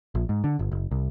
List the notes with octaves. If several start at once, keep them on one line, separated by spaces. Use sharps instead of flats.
A#1
G#2
D3
G1
F#1
C2